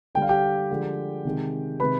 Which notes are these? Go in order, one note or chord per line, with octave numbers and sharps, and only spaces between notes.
D3 G3 G5
F5
G4 G5
D3 F3 G#3
C3 D#3 G#3
C3 D#3 G#3 B4 B5